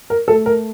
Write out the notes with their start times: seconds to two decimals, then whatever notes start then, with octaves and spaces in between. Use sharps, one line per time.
0.10 A#4
0.28 A3 A4
0.46 A#4